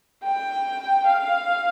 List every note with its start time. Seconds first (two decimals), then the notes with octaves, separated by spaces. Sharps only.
0.24 G5
1.06 F5